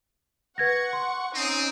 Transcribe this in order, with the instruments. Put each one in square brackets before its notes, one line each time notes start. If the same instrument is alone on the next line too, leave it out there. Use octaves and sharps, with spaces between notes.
[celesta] B4 G#6 A#6 [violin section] F#5 C#6 C#7
[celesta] C6
[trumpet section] C4 [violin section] C#4 D#4 D#6